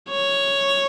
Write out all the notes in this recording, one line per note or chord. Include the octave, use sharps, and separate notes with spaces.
C#5